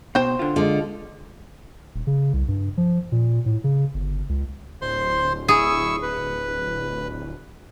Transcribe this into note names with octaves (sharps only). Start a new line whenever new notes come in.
B2 C5 G5
D3 F4
D3 G#3 F4
D#1
C#3
C2
G2
F3
A#2
A2
C#3
G1
C#2
D1 C5 C6
E4 G#4 C#6 E6
B4